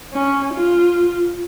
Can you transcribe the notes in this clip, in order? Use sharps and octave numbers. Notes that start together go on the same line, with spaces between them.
C#4
F4